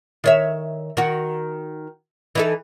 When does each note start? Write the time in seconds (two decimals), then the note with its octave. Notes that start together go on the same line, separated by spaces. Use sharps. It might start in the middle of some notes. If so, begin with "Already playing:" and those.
0.24 D#3 C#5 E5
0.97 D#3 F#4
2.35 E3 D#4 A4